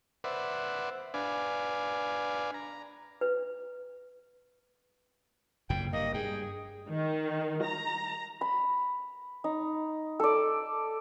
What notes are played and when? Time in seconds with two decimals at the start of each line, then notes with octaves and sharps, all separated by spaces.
0.24 B4 C5 D5 E5 F#5
1.14 D4 B4 D5 F5 G#5
2.54 A#5
3.21 B4
5.70 F#1 F2 A#2 G5
5.93 G2 A#3 D#5
6.14 G2 G#4 G5
6.89 D#3
7.64 A#5
8.41 B5
9.44 D#4
10.20 A4 D5